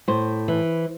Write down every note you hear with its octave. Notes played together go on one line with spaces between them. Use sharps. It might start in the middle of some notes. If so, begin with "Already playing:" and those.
A2 C5
E3